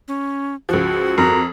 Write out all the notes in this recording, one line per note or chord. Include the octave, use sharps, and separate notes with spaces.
C#4
C#2 F3 F#4
F2 A#4